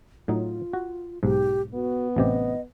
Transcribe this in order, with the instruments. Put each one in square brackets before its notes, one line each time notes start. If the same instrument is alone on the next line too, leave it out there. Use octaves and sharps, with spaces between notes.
[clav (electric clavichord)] A2 F#3 D#4 [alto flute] F4
[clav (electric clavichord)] F#4
[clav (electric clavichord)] B1 G#2 [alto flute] G4
[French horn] B3 [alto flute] F#4
[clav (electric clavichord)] A1 C3 G4 [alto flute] D#5